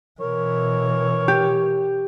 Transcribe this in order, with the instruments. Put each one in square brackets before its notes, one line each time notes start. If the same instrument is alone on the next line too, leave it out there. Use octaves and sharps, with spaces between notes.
[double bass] B2 E3 [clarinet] A#4 [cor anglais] C#5
[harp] G4